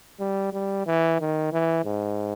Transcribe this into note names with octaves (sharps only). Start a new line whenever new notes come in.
G3
G3
E3
D#3
E3
G#2